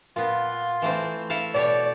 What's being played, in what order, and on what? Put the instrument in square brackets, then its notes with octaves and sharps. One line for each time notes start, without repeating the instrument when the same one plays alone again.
[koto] A#2 B3 [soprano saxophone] F4
[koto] E3 A3 C4
E4 A4 F5
[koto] B2 G4 C#5 [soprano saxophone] D5